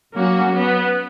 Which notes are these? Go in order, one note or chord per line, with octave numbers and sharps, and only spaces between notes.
F#3 A#3 C#4 F#4
B3